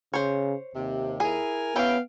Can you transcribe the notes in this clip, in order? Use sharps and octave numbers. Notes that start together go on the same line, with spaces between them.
C#3 C5 C#5
D#2 C3
E4 G#4 A#4 G#5
B3 C#4 E4 G4 B4 F5 G5